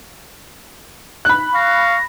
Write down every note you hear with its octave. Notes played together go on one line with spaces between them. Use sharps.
B5 F#6
F5 C#6 A#6